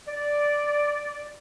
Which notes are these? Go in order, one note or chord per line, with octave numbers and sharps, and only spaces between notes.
D5